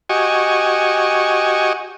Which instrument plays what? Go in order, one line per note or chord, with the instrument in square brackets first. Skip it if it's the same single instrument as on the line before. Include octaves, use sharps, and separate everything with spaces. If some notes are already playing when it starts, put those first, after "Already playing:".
[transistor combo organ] F#4 G4 D#5 G#5 C#6